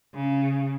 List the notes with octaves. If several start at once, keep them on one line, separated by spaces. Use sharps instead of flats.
C#3